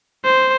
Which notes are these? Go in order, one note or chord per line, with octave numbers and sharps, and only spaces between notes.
C5